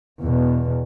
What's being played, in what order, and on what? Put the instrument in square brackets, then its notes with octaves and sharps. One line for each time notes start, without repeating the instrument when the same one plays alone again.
[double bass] E2 B2